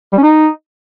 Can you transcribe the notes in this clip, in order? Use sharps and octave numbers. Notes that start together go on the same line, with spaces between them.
G3
C#4
D#4